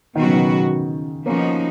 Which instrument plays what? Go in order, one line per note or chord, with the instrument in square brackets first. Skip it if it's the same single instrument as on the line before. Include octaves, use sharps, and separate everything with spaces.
[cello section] B2 F#3 B3 F#4 [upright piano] D#3
[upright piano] C#3
D#3
[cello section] F3 B3 D#4 F#4 [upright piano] A#3 C#4